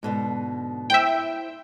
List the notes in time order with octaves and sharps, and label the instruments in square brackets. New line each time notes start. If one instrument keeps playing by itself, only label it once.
[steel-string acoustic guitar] G#2 B2 D3
[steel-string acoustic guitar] E4 C5 [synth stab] E5 G5